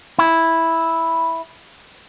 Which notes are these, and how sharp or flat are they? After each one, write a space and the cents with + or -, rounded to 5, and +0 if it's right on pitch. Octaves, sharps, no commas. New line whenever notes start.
E4 -5